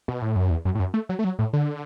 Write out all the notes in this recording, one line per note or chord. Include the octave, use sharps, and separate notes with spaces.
B2
A2
F#2
E2
F#2
A2
F#2
A3
F#3
A3
F#3
A2
D3